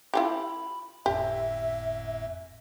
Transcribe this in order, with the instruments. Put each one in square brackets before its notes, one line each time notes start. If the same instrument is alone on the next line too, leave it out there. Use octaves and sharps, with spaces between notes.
[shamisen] E4 F4 G4 [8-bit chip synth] B5
[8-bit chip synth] G1 F2 A2 [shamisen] G4 [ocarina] E5